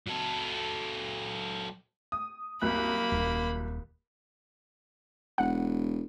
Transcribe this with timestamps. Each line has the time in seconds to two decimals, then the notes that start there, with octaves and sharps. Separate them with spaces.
0.07 F#3 A4
2.12 D#6
2.62 C2 F#2 A#3 B5 F#6
3.12 D#1
5.38 E1 F#5